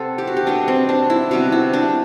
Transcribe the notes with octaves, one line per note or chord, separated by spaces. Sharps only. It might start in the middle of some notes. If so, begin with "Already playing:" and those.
Already playing: C3 B3 A4 C5
G4
F#4
G4
B2 G3 B3 D4
C4
D4
E4
C3 G3 B3 F#4
E4
D4